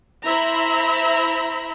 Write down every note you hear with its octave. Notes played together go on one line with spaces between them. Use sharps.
E4 C5 E5 A#5 B5